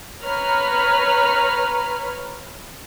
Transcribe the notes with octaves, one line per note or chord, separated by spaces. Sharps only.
B4 C#5 A#5 F6